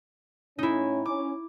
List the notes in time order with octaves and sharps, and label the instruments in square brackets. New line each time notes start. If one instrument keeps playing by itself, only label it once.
[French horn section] A2 C#4 [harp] D#4 E4
[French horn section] C#4 [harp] D6